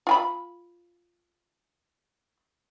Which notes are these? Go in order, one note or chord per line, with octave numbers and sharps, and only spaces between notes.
F4 G#5 B5